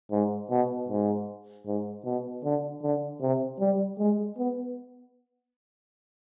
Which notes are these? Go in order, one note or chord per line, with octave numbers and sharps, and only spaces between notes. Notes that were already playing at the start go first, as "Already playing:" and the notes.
G#2
B2
G#2
G#2
B2
D3
D3
C3
G3
G#3
B3